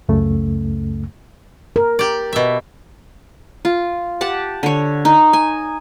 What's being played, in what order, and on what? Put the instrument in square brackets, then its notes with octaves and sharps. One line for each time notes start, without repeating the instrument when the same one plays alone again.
[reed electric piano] C#2 F#2 C#3 A3
[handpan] A#4
[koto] G4 D5
B2 E5
[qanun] F4
G4 F#5 A5
D3 C#5
D#4
G#5